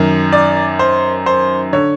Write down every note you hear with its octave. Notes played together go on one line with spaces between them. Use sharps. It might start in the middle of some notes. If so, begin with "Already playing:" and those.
Already playing: F#2 D#3
D5
C5
C5
D3 C#5